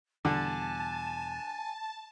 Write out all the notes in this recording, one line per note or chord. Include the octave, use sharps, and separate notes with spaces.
E2 B2 D3 G3 G#5 A5